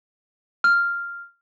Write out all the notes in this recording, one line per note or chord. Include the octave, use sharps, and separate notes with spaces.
F6